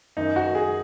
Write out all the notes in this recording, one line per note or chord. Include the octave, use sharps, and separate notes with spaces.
F#2 D#3 D#4
F#4
G#4